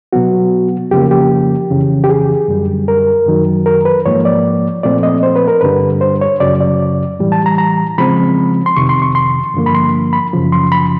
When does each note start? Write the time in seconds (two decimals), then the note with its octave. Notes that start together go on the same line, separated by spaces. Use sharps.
0.13 B2 F#3 B3 F#4
0.91 F2 C#3 F3 A#3 G4
1.11 G4
1.70 F2 C#3 E3
2.04 G4
2.09 G#4
2.48 F#2 D3 G3
2.88 A#4
3.26 F#2 D#3 F#3
3.66 A#4
3.85 B4
4.06 G#2 F3 A#3 C#5
4.25 D5
4.83 A#2 F3 A3 C4 D5
5.03 D#5
5.23 C5
5.36 B4
5.48 A#4
5.61 G2 D3 G3 B4
6.01 C5
6.21 C#5
6.40 F#2 C#3 F#3 D5
6.61 D5
7.20 A2 E3 G3
7.32 A5
7.46 A#5
7.58 A#5
7.98 C#3 F3 G#3 C4 B5
8.66 C6
8.76 F2 C3 D#3 C#6
8.89 C6
9.02 C#6
9.15 C6
9.54 G2 D3 F3 A#3
9.66 B5
9.75 C6
10.13 B5
10.33 F#2 C#3 F3
10.52 C6
10.72 B5